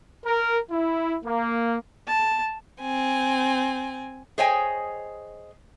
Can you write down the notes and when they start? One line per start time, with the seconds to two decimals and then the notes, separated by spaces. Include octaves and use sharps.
0.25 A#4
0.71 E4
1.25 A#3
2.07 A5
2.81 C4 G#5
4.38 G#4 C5 C#5 D#5 G5 G#5